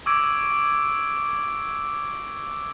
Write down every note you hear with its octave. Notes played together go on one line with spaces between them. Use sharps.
C#6 D6 E6 G#6 D7